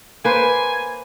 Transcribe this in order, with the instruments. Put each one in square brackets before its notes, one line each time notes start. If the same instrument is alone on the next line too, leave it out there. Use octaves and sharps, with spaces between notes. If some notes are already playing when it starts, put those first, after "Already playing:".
[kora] A#3 B4 C5 [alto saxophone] G#5